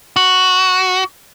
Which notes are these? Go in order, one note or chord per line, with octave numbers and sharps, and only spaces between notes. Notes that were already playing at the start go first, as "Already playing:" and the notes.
F#4